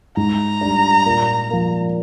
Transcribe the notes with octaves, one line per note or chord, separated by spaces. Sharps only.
G#2 A#5
G3 D4
A#2
F3 A#3